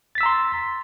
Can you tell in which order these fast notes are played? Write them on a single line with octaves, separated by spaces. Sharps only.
A6 B6 E6 A#5 C6